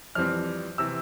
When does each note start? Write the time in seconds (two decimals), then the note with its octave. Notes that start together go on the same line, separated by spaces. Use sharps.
0.15 F2 E3 G3 C4 F6
0.78 C3 E3 E6